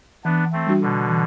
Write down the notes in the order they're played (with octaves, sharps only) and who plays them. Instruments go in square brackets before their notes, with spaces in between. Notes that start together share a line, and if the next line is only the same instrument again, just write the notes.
[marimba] E3 [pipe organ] B3 D4
[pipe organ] A3 C4
[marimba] G3 D4 F#4
[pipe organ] B2 D3
[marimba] E3